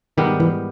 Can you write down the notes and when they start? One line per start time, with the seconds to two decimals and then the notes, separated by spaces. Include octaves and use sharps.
0.18 G#2 D#3 G3 B3 G4 A#4
0.40 E3